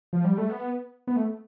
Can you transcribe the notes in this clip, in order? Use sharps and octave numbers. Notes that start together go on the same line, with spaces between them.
F3
G3
A3
B3
B3
A3